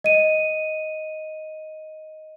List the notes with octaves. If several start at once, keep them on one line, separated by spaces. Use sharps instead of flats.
D#5 D#7